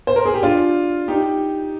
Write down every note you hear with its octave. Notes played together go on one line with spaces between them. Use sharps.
C5
A#4
G#4
G4
D4 F4
D#4 G4